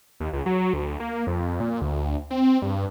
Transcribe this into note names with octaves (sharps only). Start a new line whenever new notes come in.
D#2
C#2
F#3
D2
A#3
F2
A#2
D2
C4
G2